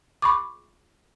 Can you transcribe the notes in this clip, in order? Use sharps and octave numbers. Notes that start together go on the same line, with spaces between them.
B5 C#6 D6